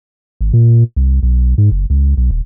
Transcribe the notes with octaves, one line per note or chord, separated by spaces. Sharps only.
G#1
A#2
C2
B1
G#2
F#1
C#2
B1
D#1